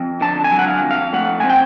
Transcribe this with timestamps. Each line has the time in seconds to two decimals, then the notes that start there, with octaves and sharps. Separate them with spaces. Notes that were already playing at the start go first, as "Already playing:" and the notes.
Already playing: F2
0.21 D3 A5
0.44 G#5
0.52 F#3
0.59 F#5
0.67 F5
0.83 F2
0.91 F5
1.13 A3 F#5
1.40 C4 G#5
1.50 G5